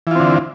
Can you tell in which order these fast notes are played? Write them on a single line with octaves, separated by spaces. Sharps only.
E3 F4 C4 D3